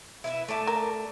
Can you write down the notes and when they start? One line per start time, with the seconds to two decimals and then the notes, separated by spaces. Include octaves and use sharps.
0.24 E4 B4 E5
0.48 A3 D5 A5
0.67 A#4